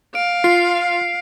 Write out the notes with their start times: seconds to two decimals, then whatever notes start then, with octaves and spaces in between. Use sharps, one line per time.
0.15 F5 D7
0.44 F4 C7